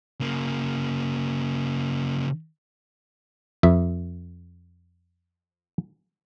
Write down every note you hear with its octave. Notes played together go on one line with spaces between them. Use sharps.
C#3 A#3
F2 E5